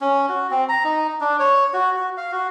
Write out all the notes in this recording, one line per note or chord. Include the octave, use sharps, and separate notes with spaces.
C#4
F#4
C4
A#5
D#4
D4
C#5
F#4
F#4
F5
F#4